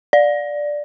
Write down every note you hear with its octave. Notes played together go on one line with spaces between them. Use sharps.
D5